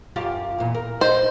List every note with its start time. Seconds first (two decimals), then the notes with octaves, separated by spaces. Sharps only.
0.16 F#2 F4 G4
0.58 E2 A#2
0.75 A#4
1.01 C5 D#5